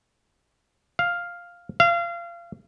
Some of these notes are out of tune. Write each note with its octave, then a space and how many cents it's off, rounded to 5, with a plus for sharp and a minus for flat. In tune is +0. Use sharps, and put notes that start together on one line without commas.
F5 +0
F5 -30